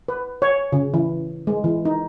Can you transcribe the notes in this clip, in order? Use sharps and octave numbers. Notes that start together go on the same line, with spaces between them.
B4
C#5
C#3
E3
G#3
E3
D#4